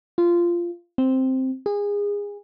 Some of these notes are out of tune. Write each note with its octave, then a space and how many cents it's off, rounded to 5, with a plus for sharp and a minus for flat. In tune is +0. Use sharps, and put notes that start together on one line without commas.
F4 -15
C4 +0
G#4 -25